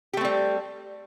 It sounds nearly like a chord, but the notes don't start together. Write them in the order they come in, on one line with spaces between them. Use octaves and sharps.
G4 A3 C4 G3